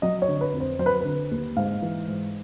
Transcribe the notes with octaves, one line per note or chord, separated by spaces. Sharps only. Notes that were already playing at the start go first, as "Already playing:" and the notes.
F#3 D#5
C#5
D3
B4
F2
C5
F#3 C5
B4
D3 B4
D#2
G#2 F5
E3
G#2